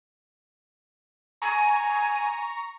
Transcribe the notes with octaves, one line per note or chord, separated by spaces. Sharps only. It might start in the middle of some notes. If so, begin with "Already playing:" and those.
G#5 A#5 C#6